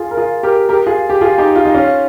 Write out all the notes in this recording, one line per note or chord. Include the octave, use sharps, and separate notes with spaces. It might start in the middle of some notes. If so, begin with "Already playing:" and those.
Already playing: F4 G#4
A#4
F4 G#4
G4 A#4
G4 A#4
F4 G#4
G4
F4 G#4
D#4 G4
F4
D#4
C#4 F4